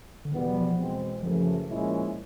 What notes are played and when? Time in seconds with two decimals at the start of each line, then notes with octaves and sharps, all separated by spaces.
0.25 D3
0.33 E2 B2 D#3 G3 B3
0.49 F#3
0.55 F3
0.78 E2 B2 G#3 C4
1.23 F#2 C#3 E3 F3 A3
1.68 A#2 F3 G#3 C#4 E4